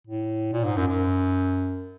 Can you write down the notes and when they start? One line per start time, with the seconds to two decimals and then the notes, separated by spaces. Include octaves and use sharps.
0.07 A2
0.53 A#2
0.65 G#2
0.76 F#2
0.88 F#2